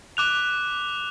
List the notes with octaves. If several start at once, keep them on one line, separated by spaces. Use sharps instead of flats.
D6 F#6 F7